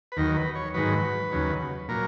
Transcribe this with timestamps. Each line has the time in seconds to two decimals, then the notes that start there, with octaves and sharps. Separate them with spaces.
0.12 B4
0.17 D#2 D#3 F#3 A#4
0.37 B4
0.55 C#5
0.74 G#2 D#3 F#3 B4
1.32 D#2 C#3 F#3
1.89 A#2 F#3 A#4